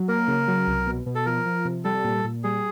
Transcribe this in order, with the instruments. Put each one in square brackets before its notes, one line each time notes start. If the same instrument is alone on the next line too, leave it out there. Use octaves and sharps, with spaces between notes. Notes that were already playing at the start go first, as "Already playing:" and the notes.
Already playing: [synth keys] F#3
[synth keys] A#3 [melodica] A#4
[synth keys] C#3
F#3
C2
B2
B2
[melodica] A4
[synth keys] F3 [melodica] A#4
[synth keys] F3
C3
[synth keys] G3 [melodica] A4
[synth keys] A#2
A#2
[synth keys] G3 [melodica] G#4